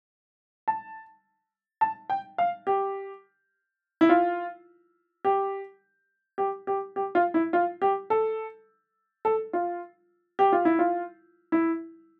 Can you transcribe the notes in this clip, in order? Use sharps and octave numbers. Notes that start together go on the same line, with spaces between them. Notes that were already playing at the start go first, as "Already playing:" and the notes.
A5
A5
G5
F5
G4
E4
F4
G4
G4
G4
G4
F4
E4
F4
G4
A4
A4
F4
G4
F4
E4
F4
E4